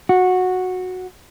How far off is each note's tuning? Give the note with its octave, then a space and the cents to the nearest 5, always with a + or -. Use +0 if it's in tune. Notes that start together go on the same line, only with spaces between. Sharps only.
F#4 -10